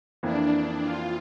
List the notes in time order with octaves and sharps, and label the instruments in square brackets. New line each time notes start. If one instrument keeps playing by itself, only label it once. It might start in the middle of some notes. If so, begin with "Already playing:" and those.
[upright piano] F2 E3 A#3 [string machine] D4
[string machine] F4